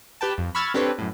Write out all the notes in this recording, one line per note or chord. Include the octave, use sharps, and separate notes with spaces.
G4 B4 G5 A5
F2
B5 C#6 E6 F6 G#6 A6
C4 D4 G4 A4 B4 C#5
F#2 A2